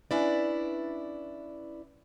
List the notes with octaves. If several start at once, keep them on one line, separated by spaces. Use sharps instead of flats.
C#4 D4 E4 B4 D5